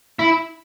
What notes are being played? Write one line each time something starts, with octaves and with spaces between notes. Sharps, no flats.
E4